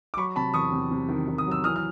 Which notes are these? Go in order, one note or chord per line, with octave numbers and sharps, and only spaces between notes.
D6
F#3 B5 C#6
C3 A5 B5
E2 C#6 D#6
C3
C3
D#3
D#3
D#6
F#3
E6
E3 D#6 F6
F6